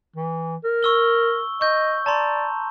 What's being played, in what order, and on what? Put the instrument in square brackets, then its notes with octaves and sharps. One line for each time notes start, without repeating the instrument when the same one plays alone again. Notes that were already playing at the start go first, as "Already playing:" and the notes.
[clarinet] E3
A#4
[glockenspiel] C#6 E6 G7
[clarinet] D#5 [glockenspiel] C#6 G6
[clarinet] D5 [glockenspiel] A5 A#5 C6